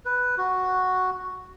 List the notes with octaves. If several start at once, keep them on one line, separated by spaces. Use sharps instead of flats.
B4
F#4